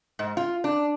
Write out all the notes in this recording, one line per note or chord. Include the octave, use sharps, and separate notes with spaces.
G#2
F4
D4